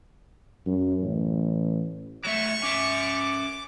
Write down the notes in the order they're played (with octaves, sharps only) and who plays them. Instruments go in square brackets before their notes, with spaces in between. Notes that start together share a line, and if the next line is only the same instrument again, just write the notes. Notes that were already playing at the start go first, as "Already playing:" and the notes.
[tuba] F#2
A1
[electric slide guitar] F#3 A3 E5 [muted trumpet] C#6
[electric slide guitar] C#4 E5 [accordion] D6